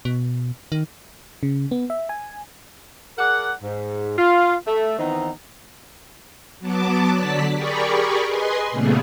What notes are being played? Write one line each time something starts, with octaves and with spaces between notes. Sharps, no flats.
B2
D#3
C#3
B3
E5
G#5
G#4 A#4 D5 F#5
G#2
F4
A3
D#3 E3 B3 C4 D#4
F#3 B3 A5 D6
D3 F#3 D5 A5 B6
G4 G#4 A#4 D5 B5 C#6
G#4 B4 D#5 G#5 C6
A#2 C#3 G3 A3 B3 G#4